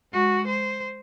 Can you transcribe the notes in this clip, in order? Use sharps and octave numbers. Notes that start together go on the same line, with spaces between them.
G#3 F#4
C5